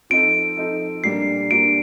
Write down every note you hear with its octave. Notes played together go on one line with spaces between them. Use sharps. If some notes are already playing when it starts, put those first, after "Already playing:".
F3 C4 D#4 A4 D7
F3 C4 D#4 A4
A#2 G3 A#3 D4 C7
A#2 G3 A#3 D4 D7